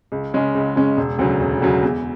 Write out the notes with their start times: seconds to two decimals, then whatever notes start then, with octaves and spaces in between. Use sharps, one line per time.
0.12 C#2
0.34 C#3 G#3 C#4
0.55 C#2
0.76 C#3 G#3 C#4
0.97 E1
1.19 D2 C#3 F#3
1.40 E1
1.62 D2 C#3 F#3
1.83 E2